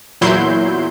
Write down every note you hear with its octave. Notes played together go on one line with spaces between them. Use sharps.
E2 A#2 F#3 E4 C6 G6